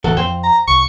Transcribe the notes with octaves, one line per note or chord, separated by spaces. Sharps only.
F#1 A2 E3 F#4 A4
F2 C5 G5
A#5
C2 C#6